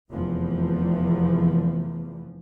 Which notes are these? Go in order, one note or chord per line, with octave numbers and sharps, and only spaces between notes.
F1 E2 E3 F3